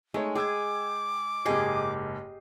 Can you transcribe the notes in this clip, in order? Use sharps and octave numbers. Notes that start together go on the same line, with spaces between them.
G#3 A3 D#4 C#5
G#4 G5 D6 E6 G#6
F#1 G#2 G4 G#4 D#5 C7